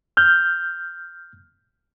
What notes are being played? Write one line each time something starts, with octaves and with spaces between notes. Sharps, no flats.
F6 G6